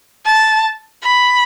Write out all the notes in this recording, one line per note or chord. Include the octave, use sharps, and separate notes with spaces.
A5
B5